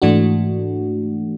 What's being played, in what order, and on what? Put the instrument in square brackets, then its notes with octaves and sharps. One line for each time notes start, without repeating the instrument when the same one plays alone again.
[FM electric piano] G#2 E3 A3 D4 F#4